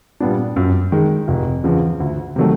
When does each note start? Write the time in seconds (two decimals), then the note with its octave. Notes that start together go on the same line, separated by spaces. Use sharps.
0.20 A#2 G3 B3 D4
0.56 F#2
0.92 D#3 G#3
1.28 F1
1.64 E2 C#3 F3
2.00 D2
2.36 C3 D#3 F#3 A3